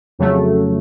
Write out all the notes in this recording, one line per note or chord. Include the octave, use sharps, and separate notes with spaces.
F2 C#3 F#3 A3